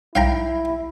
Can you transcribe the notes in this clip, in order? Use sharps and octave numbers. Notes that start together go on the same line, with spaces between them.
B1 E4 F5 G5 A#5